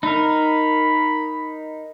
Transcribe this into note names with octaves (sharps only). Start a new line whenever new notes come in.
D#4 A#4 B5